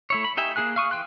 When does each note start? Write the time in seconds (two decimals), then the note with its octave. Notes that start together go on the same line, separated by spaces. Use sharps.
0.10 A3 E4 C#5
0.24 B5
0.37 D#4 G4 E5 G#5
0.56 A#3 F4 G#4 G#5 F#6
0.76 F5 C#6 D#6
0.91 E3 G5 C6 F#6